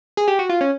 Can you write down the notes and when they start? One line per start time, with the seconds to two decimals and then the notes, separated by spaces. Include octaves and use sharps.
0.17 G#4
0.28 G4
0.39 F#4
0.49 F4
0.61 C#4